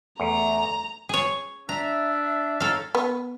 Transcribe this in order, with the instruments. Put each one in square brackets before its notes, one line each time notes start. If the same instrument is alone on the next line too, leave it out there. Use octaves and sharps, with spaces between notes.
[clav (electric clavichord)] E2 [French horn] A3 [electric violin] A#5
[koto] G#4 C#5
[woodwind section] D4 E5 [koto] A#5
[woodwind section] D#4 C#5 E5 [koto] A4 F5
[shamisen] B3